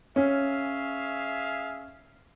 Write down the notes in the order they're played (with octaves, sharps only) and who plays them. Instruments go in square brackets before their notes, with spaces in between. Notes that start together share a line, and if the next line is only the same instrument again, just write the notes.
[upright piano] C#4 [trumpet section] G#4 E5 F5